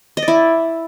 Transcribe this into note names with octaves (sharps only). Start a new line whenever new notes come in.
D#5
D5
E4